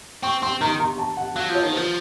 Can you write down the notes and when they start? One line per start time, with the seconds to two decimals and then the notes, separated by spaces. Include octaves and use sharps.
0.23 C4 C#6
0.42 C4 C6
0.61 D#3 A#5
0.80 A#5
0.98 A5
1.17 F#5
1.36 F#3 F5
1.49 F3
1.54 C#5
1.63 D#3
1.73 F3 C5